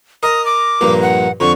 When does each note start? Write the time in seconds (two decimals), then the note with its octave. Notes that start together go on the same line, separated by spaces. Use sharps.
0.23 A#4 D#5 D#6
0.46 D6
0.81 A#1 G2 A#3
1.02 F#5
1.40 F2 D3 C#6